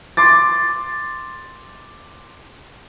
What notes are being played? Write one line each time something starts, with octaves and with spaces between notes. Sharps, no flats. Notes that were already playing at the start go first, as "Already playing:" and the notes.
C6 D6 A6